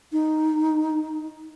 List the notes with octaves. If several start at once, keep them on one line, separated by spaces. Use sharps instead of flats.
D#4